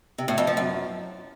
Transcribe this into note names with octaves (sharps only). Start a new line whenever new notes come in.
C3
A2
F2
F3
F#2